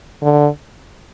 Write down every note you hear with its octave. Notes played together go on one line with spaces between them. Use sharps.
D3